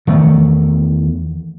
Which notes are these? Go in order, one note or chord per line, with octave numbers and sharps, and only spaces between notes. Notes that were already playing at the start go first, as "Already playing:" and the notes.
E2 D#3 A3